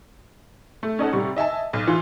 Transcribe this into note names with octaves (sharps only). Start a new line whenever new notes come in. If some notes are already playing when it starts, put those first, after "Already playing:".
A3
C#4 D#4 A4 F#5
C3 G3 C#6
D#5 E5 G#5 A5
B1
E3 F4